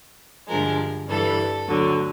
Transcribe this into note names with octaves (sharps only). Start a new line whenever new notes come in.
G2 D3 F3 G#3 A#4
G2 E3 G3 A4
D2 D3 F#3